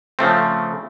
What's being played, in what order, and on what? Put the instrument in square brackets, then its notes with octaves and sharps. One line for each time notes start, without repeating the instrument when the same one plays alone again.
[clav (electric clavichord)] C#3 F3 A3 C4